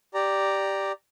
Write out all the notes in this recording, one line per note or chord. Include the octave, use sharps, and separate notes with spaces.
G4 D5 A#5